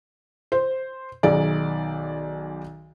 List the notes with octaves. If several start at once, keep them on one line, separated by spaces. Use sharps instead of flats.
C5
B1 D#3 G#4 D5